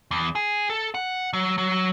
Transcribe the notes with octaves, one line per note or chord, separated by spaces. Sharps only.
E2
G#4
A4
F#5
F#3
F#3